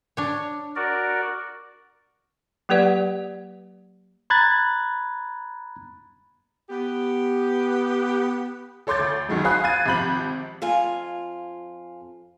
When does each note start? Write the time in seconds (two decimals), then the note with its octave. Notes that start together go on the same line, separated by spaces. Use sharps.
0.17 D4 C#5
0.76 F#4 A#4 D5
2.69 F#3 A#3 G4 B4 D5 F#5
4.30 A#5 B5 F#6 G#6 A6
6.70 B3 G4
8.87 A4 C#5 C6 D6 G6 A6
8.99 D2
9.29 C#2 F#2 D#3 F#3 G#3
9.45 C5 F5 G#5 B5 D#6 F#6
9.64 F5 G#6 A6 D#7
9.86 G#1 C3 F3 B5 G6 F#7
10.62 F2 F4 G#5